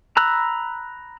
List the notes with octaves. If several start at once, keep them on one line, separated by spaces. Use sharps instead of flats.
A#5 B5 E6 F#6